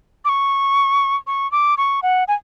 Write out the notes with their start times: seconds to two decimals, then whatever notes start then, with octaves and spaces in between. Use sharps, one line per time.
0.25 D6
0.29 C#6
1.27 C#6
1.52 D6
1.77 C#6
2.03 F#5
2.28 G#5